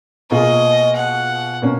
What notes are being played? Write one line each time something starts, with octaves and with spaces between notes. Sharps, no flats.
B2 A#3 F4 G#4 D#5
F#5
B2 A#3 C#4